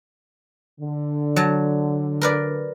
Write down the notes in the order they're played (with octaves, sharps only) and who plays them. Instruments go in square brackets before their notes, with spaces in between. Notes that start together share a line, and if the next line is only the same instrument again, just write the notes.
[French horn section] D3
[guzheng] F#3 A5
A#4 B4 D5